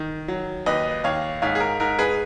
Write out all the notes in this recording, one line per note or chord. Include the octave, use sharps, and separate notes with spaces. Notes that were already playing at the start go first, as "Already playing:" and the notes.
Already playing: D#3
F#3
D#2 B4 D#5
D#2 C#5 F5
G#2 C#5 F5
G#4
A#4
G#2 A#4
G#4 B4